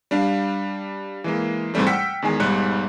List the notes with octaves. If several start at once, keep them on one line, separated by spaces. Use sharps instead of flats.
G3 D4 F5
E3 G#3 A#3
G#2 C3 E3 G3 A3
F#5 G5 E6 F6 B6 C#7
E2 D#3 G#3 G#5
B1 G#2 G3 F#6 C#7